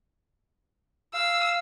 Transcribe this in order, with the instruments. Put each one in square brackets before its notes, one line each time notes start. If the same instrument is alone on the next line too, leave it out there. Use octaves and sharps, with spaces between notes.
[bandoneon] F5 [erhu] E6